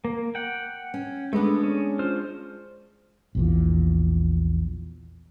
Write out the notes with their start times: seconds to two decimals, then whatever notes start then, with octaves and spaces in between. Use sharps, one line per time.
0.05 A#3
0.35 F#5 G5
0.94 C#4
1.33 G#3 A3 B3 D4
1.64 C#4
1.99 F4 C5 F6
3.35 A#1 E2 A#2